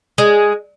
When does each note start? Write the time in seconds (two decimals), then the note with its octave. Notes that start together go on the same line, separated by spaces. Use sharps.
0.18 G#3